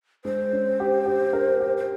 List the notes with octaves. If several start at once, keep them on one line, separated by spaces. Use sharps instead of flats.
G#3 C5
C#4
G4
G4
A#4
G4
C5